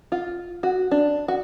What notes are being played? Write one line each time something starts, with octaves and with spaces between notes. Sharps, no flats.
F4
F#4
D4
F#4